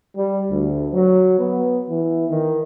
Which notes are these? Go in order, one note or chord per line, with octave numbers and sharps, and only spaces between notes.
G3
D2
F#3
B3
E3
D#3